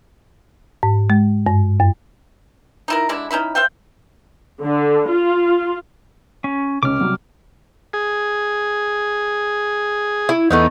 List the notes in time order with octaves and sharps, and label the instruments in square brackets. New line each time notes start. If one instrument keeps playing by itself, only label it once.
[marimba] G#2
G#3
G2
F#2
[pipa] D#4 E4 A#4
D3 G#3 D4 E4
C#4 D#4 E4 B5
C5 E5 F5 G5
[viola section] D3
F4
[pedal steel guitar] C#4
[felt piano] C#2 C#4 [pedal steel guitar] D6 F6
[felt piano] C3 F#3 G3
[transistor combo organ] G#4
[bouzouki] E4
[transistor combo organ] E2 [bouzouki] A3 B3 D#4